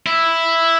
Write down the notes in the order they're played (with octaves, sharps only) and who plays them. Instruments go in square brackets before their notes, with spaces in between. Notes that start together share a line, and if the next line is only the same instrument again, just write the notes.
[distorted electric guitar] E4